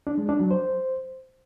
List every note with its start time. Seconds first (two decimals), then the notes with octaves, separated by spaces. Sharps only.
0.07 D4
0.18 G#3
0.29 D4
0.40 F#3
0.51 C5